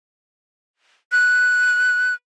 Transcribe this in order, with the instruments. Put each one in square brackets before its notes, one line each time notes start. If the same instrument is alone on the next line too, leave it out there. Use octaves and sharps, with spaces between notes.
[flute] F#6